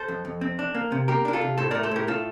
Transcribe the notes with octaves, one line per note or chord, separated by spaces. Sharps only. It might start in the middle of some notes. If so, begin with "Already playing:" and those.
Already playing: A4 C5
F2
F2
C4
D4
A#3
C3
A#3 G4 A#4
D4 A#4
F4 A4
C3
A2 A4 C5
A3 A#4 D5
A4 C5
A2 G4 A#4
A2 F4 A4